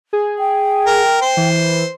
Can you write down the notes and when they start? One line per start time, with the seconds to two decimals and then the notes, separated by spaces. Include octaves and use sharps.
0.13 G#4
0.39 G5
0.86 A#4
1.22 C5
1.37 E3